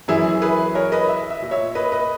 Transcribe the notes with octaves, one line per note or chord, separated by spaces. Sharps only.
F#2 E3 E4 G#4
G#4 B4
A#4 C#5
B4 D#5
E5
E5
A#2
C#5 E5
B4 D#5
B4 D#5